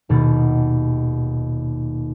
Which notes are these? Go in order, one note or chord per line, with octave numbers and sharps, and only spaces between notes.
D#1 D#2 B2 F#4 D#5 A6